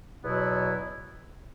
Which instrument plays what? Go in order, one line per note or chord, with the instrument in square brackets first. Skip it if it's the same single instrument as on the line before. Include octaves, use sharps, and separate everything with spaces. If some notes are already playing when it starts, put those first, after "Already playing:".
[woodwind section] E2 B2 F#3 B3 E4